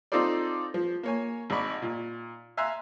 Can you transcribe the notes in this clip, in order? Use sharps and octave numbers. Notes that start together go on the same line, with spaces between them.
C4 D#4 F4 A4 C5 D5
F3
A#3 C#5 G#5
G#1 D5 D#5 B5 C#6
A#2
E5 F5 G#5 A#5 C6 F#6